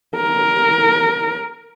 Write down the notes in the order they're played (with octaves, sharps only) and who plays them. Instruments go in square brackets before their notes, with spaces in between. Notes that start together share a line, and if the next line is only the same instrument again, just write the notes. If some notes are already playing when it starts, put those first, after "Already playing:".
[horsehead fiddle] A#4